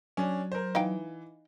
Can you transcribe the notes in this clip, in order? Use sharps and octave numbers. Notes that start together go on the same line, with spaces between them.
F#3 C#4 D4
A#4 C5
E3 D#4 F5 G5